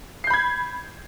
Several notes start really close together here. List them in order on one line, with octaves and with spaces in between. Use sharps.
C7 G6 B5 G#6